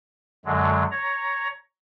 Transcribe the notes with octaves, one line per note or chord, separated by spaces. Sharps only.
F#2 D3 F#3 G#3
C#5 A#5